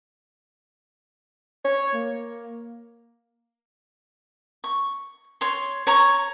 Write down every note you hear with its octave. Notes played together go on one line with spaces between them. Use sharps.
C#5
A#3
C#6
C#5 C6
C#5 A#5 C#6